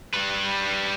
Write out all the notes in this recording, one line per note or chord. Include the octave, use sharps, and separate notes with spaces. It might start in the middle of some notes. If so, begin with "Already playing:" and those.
G3 B4